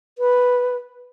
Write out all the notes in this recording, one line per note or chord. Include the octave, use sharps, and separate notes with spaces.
B4